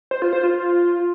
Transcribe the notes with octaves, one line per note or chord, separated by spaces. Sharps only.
C5
F4
C5
F4